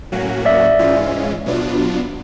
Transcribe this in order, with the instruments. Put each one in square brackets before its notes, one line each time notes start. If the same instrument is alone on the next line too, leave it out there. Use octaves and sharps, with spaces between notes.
[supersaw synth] A2 F#3 A#3 C#4 F#4
[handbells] D5 E5
[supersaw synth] G#2 E3 G#3 C#4 F4
B2 F#3 B3 D4 F4